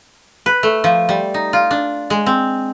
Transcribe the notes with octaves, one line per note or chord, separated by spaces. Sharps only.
B4
A3
F3
G3
D#4
F4
D4
G#3
C4